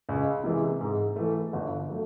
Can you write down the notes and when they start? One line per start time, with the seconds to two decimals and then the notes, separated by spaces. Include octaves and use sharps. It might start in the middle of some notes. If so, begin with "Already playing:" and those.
0.09 C#2
0.44 C3 E3 G#3
0.81 G#2
1.16 E3 A3
1.53 G1
1.89 F#3 A3